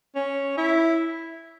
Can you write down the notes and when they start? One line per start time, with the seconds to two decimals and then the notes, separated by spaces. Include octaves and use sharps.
0.16 C#4
0.57 E4